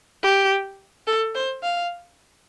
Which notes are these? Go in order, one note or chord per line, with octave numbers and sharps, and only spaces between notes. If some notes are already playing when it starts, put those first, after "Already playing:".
G4
A4
C5
F5